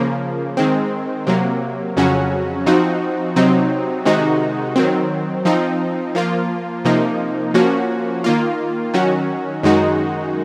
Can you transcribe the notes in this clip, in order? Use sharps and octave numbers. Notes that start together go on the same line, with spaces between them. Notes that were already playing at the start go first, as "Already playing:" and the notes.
Already playing: C#3 F3 A#3
D#3 G#3 C4
C3 F#3 A#3
F2 C#3 F#3 C#4 F#4
F3 C4 D#4 F#4
C3 F#3 C4 D#4
C3 D#3 G#3 D#4 F#4
D#3 F#3 C4
F3 C4 D#4
F3 A#3 F4
C3 F3 A#3 D#4
F3 A#3 C#4 F#4
D#3 A#3 F4
D#3 F#3 C#4 F#4
F#2 D#3 G#3 D#4 F#4